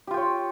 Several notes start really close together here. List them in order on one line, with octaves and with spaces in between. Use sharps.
G4 F4 G5 C#5